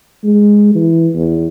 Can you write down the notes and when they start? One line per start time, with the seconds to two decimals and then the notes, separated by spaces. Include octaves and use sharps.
0.24 G#3
0.75 E3
1.15 E2